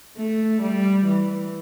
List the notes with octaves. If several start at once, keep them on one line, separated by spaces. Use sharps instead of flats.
A3
G3
E3